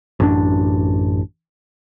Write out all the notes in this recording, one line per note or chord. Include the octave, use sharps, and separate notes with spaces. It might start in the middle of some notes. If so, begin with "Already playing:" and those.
A1 F#2 D4